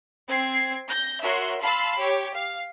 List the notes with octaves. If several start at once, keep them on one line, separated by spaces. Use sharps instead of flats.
C4 G#6 C7
G6 A#6
F#4 A#4 C#5 E5 C6
F5 A5 B5 C6 E6
G4 C#5
F5